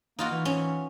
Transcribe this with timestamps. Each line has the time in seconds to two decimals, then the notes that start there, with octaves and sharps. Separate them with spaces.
0.19 A#3 D#4 F4 F#4
0.31 E3
0.45 C#4